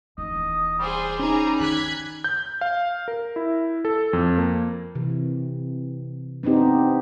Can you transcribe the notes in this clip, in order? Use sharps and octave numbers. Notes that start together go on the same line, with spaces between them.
D#1 E3 D#5
G3 G#4 C5
C#4 D#4 G#4 A#5
D#3 F#6 G#6 B6
G6
F5
A#4
E4
A4
F2
A#3
C3 E3
B3 C4 D4 D#4 G4